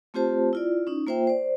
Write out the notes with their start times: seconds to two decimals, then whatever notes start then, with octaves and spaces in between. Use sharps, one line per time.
0.14 A3 C4 F4 G4 C5 A5
0.53 E4 F4 D5
0.87 C#4 D#4
1.07 A#3 F4 C5 E5 G5
1.27 C5 D5